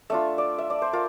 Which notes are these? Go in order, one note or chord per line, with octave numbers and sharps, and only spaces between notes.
A3 D4 F4 E5
D5
E5
D5
C5
F4 A#4